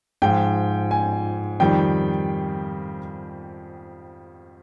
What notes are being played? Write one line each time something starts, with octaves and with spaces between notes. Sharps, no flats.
G#2 F3 G5
G#5
F2 D#3 G3 G5